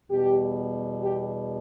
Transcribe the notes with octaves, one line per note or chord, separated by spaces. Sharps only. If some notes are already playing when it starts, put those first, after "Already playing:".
E2 B2 G3 G4
G4